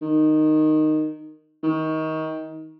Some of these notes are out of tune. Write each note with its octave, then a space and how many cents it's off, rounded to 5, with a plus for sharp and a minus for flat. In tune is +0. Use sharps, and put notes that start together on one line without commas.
D#3 -10
D#3 +25